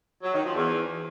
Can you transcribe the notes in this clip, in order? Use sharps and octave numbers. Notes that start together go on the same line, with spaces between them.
F#3
D#3
F3
E2